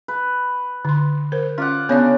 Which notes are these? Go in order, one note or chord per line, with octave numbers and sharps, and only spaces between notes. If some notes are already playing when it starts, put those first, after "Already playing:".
B4
D3 C6
A#4 C5
C#4 F4 D5 F#5
C#3 B3 D4 C#5 D5